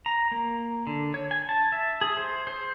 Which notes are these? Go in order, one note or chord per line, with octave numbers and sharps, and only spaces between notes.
A#5
A#3
D3
C#5
G#5
A5
E5
G#4
C5
C5